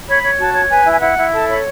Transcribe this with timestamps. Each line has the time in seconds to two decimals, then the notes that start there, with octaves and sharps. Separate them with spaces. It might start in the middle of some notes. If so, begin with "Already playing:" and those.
0.07 C#5 B5
0.22 C#5
0.37 F#4 A5
0.53 C#5
0.69 B4 G#5
0.85 E4
0.90 G#5
1.00 E4 F#5
1.17 E4
1.32 A4 A5
1.48 C#5 B5